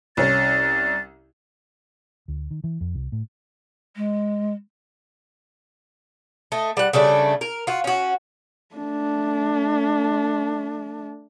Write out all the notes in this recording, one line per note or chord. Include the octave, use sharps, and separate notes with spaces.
C2 C#4 A6
D2
D#3
E3
F2
C2
A2
G#3
A3 D#5
G3 F#5
C#3 G3 A3 D4
A#4
F4 F#4
C#4 F#4
A3 D4